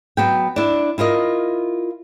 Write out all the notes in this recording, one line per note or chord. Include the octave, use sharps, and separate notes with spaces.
F#3 B3 G5
D4 E4
E4 F4 A#4 D#5